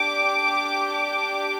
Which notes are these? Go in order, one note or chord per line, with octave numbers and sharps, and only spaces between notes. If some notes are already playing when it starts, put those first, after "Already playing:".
Already playing: D4 G4 D6
D6